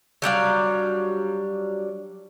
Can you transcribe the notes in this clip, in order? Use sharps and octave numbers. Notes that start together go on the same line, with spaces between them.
F#3 G3 D4 F5